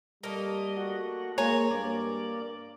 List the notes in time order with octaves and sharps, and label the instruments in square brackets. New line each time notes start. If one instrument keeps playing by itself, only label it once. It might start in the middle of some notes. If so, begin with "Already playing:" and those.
[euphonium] G3 [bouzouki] A3 A#3 [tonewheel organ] D#5
[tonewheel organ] F#4
[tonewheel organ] G#3 [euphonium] A#3 [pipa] C#5 [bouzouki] G#5 A#5
[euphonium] G2 [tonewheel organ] A#3 D5